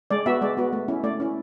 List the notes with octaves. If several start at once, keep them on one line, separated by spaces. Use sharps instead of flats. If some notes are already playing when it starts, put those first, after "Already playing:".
G#3 D5
B3 F#4 E5
G#3 D5
B3 F#4
A3
C#4 E4
A3 D5
C#4 E4